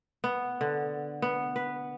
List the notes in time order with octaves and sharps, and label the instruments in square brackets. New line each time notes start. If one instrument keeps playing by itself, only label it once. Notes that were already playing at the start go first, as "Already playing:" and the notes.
[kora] B3
D3
B3
B4